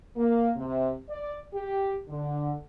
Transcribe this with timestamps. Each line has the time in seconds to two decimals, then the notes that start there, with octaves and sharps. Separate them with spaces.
0.16 A#3
0.55 C3
1.09 D5
1.53 G4
2.09 D3